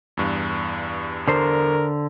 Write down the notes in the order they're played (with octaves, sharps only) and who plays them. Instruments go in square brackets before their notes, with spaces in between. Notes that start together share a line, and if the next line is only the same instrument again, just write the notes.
[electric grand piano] E2 G2
[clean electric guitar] D3 C5 [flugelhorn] A#4